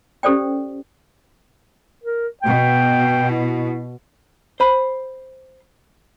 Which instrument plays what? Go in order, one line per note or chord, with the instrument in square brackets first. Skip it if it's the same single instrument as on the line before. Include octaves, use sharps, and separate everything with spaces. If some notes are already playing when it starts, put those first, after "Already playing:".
[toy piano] C#4 G4 A4 C5 D5 G5
[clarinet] A#4
[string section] B2 [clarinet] G5
[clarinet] E4
[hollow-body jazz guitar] C5 B5